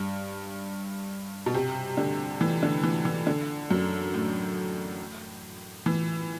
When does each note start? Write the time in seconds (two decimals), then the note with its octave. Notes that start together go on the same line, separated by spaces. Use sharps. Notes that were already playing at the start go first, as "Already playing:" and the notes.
Already playing: G2
1.46 B2
1.54 C3
1.97 D3
2.41 E3
2.63 D3
2.83 E3
3.05 E3
3.27 D3
3.71 F#2
4.14 A2
5.86 E3